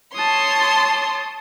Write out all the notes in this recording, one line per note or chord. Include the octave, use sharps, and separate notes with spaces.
C#5 A5 C6 D#6